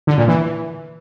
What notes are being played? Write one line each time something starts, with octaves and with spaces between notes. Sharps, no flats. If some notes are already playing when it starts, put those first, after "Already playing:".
D3
A#2
E3